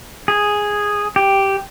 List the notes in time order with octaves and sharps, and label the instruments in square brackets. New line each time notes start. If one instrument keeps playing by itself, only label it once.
[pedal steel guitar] G#4
G4